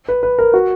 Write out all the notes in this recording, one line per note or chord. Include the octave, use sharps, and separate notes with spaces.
B4
B4
A#4
F#4